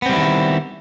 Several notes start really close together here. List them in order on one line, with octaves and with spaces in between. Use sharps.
B3 C4 G3 E4 D#3